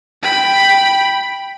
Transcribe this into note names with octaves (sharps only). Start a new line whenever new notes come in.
G5 B5